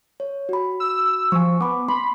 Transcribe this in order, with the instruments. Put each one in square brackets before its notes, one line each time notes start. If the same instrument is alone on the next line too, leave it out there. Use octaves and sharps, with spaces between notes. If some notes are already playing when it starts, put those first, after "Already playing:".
[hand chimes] C#5
F#4 B5
[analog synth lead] E6
[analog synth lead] F3 [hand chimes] G#5 C#6
[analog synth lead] B3 [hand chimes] B5 D6
[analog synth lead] B5 [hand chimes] C6